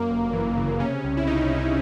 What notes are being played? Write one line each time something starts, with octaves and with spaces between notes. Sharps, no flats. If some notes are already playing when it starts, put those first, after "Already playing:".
Already playing: F#2 A#3
G1
E3
C#3
C3 C#4
C2
E4
D#4